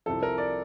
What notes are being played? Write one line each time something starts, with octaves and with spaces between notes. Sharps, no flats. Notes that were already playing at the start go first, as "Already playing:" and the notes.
C2 C3 F3 A4
A#4
D5